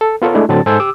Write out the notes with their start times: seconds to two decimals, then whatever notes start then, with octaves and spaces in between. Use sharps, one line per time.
0.01 A4
0.22 B3 F4 A4 A#4 C#5
0.35 G#3 A3 D4 E4
0.49 A2 D3 F#3 C4 A5 A6
0.66 G#2 A4 C5 G#5 E6 G6
0.80 G4 D6 E6